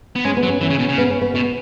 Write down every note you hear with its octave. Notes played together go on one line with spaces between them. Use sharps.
B3
G#3 C#4
B3
F#3
C#4
E3 C#4
C#3
B2
C#3
B3
C#4
B3
B2 B3